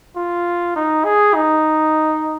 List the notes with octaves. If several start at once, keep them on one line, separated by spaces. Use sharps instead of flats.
F4
D#4
G#4
D#4